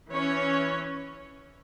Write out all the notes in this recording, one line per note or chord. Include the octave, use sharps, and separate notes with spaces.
E3 C#4 C#5